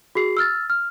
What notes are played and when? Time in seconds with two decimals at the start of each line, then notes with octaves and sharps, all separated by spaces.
0.15 F#4 G#4 C7
0.37 E6 F6 A6
0.70 F6